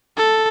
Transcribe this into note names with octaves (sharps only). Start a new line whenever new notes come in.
A4